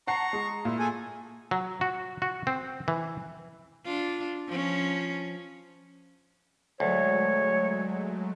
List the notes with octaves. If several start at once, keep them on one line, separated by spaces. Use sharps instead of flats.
F#5 A5 A#5 C#6 C7
G#3
A#2 E4
G#4 A4 G#5
F#3
F#4
F#4
C4
E3
D4 F4
F3 C#4
D2 F#3 G#3 A3 C#5